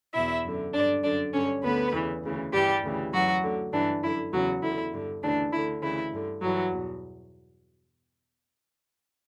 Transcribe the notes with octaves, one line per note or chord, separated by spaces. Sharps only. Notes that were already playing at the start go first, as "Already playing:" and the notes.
E2 B2 E4 E5
F#2 D3
G2 D3 D4 D5
F#2 D3 D4 D5
G2 D3 C#4 C#5
D2 D3 B3 B4
E2 C#3 E3
D2 C#3 E3
G2 E3 G3 G4
D2 C#3 E3
F#2 E3 F#3 F#4
D2 D3
G2 E3 D4
F#2 D3 E4
E2 C#3 E3 F#3 F#4
E2 D3 E4
G2 D3
D2 C#3 E3 D4
D2 D3 E4
D2 C#3 E3 E4
G2 D3
G2 E3 F#3 F#4
E2 B2